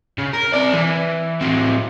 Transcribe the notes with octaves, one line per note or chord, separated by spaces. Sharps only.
C#3
A#4
C4 D5
E3
A2 C4